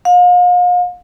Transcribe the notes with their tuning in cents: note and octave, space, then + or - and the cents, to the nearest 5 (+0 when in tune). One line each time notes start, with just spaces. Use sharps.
F5 +40